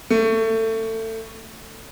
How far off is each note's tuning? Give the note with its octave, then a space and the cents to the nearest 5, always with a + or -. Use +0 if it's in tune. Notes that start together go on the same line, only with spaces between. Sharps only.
A3 +25